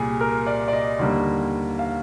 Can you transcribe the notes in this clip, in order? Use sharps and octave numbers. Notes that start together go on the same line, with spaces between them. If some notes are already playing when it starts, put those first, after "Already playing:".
Already playing: C2 A#2 G3 G#4
A#4
D5
D5
D#5
D#2 D3 G3 A#3
F5